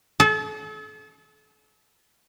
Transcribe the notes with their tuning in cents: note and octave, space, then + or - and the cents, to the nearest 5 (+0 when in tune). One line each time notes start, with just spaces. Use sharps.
A4 -40